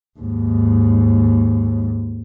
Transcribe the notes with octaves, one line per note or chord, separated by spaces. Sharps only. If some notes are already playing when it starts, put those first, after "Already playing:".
D#2 G#2